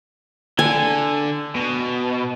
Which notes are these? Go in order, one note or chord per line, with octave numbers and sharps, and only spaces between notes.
D3 G#5
B2